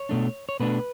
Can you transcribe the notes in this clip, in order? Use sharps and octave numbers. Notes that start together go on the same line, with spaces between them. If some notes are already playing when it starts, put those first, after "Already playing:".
Already playing: C#5
B2 A3 D4
C#5
B2 A3 D4 B4